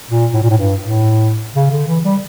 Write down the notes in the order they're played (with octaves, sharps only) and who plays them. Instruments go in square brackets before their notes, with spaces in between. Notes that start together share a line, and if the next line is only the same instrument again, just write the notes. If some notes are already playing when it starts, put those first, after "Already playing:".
[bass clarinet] A#2
A2
A#2
A2
G2
A2
C#3
D3
E3
G3